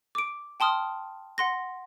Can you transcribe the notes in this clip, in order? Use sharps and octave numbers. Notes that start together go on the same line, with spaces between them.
D6 D7
G5 A5 C6 D#6 F6
F#5 C6 A#6